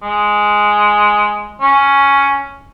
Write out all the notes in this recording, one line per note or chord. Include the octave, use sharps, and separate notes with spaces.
G#3
C#4